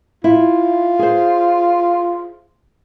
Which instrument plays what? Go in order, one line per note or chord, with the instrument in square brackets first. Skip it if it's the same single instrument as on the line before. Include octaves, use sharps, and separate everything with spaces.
[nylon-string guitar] E4 [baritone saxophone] F4
[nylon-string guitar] G#4 C5